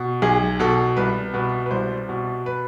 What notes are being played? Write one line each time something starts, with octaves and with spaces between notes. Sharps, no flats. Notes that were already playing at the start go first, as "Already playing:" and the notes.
Already playing: B2
B1 G#4
B2 A4
C2 B4
B2 B4
B4
C2 C5
B2
B4